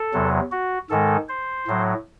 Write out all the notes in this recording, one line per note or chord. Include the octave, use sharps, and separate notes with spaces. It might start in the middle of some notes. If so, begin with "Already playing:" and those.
Already playing: A4
E2 C3 F#3
F#4
G#2 D#3 G#3 A4
C5
A2 F#3